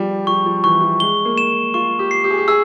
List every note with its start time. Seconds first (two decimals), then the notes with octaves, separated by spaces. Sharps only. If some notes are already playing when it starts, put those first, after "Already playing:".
Already playing: F3 G3
0.27 F3 C#6
0.46 F3
0.64 E3 C#6
0.82 F3
1.00 G#3 G7
1.25 A#3
1.38 E7
1.74 F4 C#6
1.99 G4
2.11 C7
2.24 G4
2.30 G#4
2.38 G4
2.48 G#4 E6